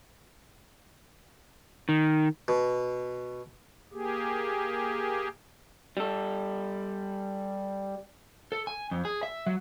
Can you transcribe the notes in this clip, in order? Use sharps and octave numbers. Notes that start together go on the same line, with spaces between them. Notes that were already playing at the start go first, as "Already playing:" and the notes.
D#3
B2
A#3 G4 G#4
G3 A4
A4
G#5
F2
G#4
E5
F#3